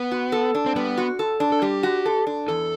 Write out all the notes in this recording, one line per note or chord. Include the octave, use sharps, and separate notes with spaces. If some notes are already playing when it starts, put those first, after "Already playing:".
Already playing: B3
F#4
A4
D4
C4
G3 B3
F#4
A4
D4
A4
G3 G4
F#4
A4
D4
E2 A4